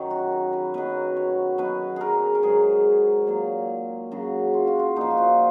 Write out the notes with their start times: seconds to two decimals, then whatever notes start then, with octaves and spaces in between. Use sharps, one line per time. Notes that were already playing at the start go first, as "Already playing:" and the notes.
Already playing: F#2 D#3 F#3
0.11 F#4
0.32 A#4
0.53 B4
0.74 B2 F#3 B4
1.17 C#5
1.58 B2 F#3 B4
1.96 G#4 A#4
2.35 A#4
2.43 G#2 F#3 G#4
3.27 A#2 F#3
4.11 F#2 C#3 F#3 F#4
4.54 F4
4.67 F#4
4.79 F4
4.96 A#2 F3 D#4
5.11 F#4
5.18 F4